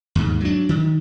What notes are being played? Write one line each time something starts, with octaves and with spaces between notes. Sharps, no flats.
D#2 G#2
F#3 D4
D#3